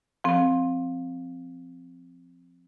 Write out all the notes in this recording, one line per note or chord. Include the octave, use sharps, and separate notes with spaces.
F3 C4